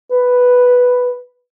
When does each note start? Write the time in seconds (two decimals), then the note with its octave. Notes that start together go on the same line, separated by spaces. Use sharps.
0.11 B4